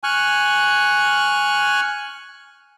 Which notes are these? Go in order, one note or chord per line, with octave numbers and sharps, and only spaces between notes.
G#5 C#6 F6 F#6